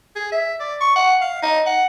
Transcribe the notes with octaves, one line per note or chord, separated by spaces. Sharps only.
G#4
E5
D5
C#6
F#5
F5
D#4
F#5